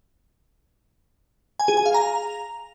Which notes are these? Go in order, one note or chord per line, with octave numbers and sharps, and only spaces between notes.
G#5
G#4
G#5
F5
A#5